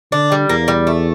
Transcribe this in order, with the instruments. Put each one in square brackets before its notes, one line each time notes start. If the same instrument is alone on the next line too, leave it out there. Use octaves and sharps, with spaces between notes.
[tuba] D3 [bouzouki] D4
[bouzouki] G3
[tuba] E2 [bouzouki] A#3
[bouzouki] G3
A3